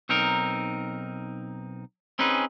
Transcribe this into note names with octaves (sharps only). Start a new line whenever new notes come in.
B1 C4 D#4 A#4
C4 C#4 D#4 G#4 B4